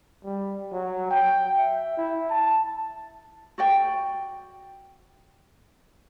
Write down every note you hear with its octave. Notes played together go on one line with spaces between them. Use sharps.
G3
F#3
G5
E5
E4
A5
F#4 D5 G5